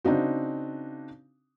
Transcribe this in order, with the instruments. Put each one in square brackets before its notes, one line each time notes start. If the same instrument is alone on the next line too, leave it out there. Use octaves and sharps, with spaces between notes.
[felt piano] C#3 C4 D4 D#4 F#4